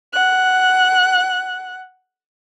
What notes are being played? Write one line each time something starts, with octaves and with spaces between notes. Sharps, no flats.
F#5 F#6